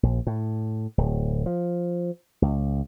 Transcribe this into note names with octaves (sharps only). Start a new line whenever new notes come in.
A#1
A2
D1
F3
C#2